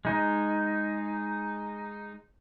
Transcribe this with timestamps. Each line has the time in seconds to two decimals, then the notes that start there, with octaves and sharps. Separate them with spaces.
0.05 G#3 D#4